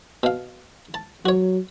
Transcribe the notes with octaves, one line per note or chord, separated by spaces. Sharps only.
B2 F5
A5
F#3 F#4 C#5